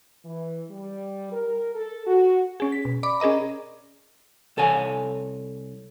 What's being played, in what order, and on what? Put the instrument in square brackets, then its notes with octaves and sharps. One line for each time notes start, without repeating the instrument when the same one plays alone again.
[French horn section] E3
G3
A#4
A4
F#4
[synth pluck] C#4 G#4
B6
B2
D5 B5 D6
C#4 G#4 A#4 D#5 A#5
[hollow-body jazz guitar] C2 A4 C#5 G#5